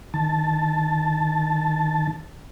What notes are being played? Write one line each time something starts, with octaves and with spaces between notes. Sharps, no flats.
D#3 A5